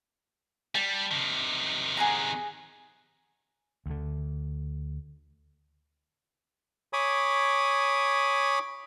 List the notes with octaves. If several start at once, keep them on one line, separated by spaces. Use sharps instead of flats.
G3 A5
C3 D#3
G#4 F#5 A#5
D2 D3
C#5 G#5 B5 D6 D#6